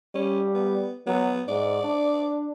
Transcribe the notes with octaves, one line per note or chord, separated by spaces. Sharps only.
G3 C#4
B3
F#3 B3
G#2 D5
D4